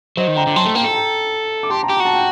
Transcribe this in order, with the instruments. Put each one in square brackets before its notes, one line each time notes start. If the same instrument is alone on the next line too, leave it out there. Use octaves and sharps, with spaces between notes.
[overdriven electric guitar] F#3 [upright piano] C5 D#5
[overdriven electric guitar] D#3
[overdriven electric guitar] D3 [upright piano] G5 A#5
[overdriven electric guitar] D3
[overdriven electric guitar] F#3 [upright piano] A5 C6
[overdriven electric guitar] A3
[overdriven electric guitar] A#3 [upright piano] G5 A#5
[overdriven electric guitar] A4
[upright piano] G5 A#5
D6
[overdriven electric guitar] G4 [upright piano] A5 C6
[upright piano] G5 A#5
[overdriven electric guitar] G4
[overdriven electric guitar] F#4 [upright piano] A#5
[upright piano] A5
G5